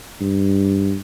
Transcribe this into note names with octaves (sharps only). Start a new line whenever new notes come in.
G2